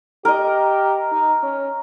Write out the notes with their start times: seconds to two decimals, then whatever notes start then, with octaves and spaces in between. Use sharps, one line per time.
0.25 G4 A#4 D#5
1.12 D#4
1.43 C#4